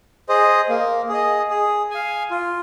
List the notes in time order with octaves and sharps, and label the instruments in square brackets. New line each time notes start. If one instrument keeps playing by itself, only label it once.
[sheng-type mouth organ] G#4 C5 D#5
A#3
G#4 D#5
G#4
F5 G#5
F4